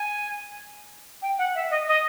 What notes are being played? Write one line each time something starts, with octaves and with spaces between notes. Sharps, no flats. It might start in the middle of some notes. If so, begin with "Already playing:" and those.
Already playing: G#5
G5
F#5
E5
D#5
D#5